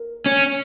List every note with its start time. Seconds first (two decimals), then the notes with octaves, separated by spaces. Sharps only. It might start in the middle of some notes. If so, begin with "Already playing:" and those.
Already playing: A#4
0.26 C#4